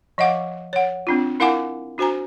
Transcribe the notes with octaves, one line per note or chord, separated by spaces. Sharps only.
F3 D#5 F5 F#5 D6
C#5 F#5
C4 D4 F4
E4 A#4 F5 F#5 G#5 D6
D4 F#4 C5 G#5 A#5